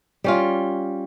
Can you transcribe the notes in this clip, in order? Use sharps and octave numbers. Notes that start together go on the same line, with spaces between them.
G3 C#4 F4